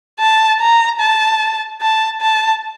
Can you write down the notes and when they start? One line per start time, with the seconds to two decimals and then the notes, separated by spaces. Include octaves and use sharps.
0.19 A5
0.60 A#5
1.00 A5
1.81 A5
2.21 A5